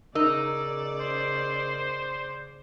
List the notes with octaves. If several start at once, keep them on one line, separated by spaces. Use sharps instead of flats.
C#3 D#4 A#4 D5 E6
C5